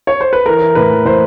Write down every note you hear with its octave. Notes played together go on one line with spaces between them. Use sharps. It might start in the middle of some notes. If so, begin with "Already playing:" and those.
C#5
C5
B4
E3 A#4
E3
A2 B4
E3
A2 C5